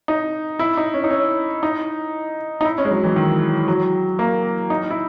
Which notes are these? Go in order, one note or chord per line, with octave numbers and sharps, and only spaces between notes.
D#4
E4
D#4
C#4
D#4
C#4
D#4
D#4
E4
C#4
G#3
F#3
E3
D#3
F#3
A#3
D#4
E4